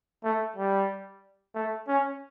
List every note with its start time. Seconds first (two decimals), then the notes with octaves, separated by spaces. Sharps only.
0.24 A3
0.56 G3
1.55 A3
1.88 C#4